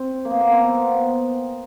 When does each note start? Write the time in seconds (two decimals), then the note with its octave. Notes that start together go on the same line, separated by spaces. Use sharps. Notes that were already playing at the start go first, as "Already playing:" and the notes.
Already playing: C4
0.25 A#3
0.30 B3
0.41 A#3
0.52 C4
0.64 C4
0.75 B3